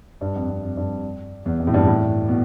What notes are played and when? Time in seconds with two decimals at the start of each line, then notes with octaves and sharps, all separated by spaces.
0.21 G2
0.35 F2
0.49 F2
0.63 F2
0.77 G2
1.46 E2
1.59 F2
1.67 A2
1.74 G2
1.87 A2
2.29 B2